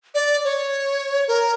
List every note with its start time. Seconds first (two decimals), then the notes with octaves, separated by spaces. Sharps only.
0.15 D5
0.45 C#5
1.28 A#4